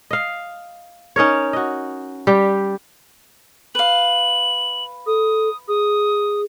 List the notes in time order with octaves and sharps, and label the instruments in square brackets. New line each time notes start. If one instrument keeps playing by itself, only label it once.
[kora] D#5 F5
C#4 D#4 A#4 C#5
F#4 D#5
G3 G4
[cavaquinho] B4 F5 [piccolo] F#7
[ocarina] A4 [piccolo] D#6
[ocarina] G#4 [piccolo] D#6